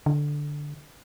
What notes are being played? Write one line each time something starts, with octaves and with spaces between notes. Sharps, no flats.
D3